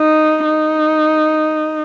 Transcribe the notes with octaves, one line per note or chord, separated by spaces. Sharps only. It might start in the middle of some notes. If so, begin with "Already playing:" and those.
Already playing: D#4
D#4